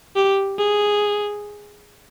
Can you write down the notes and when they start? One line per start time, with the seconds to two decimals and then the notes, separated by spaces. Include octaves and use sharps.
0.16 G4
0.58 G#4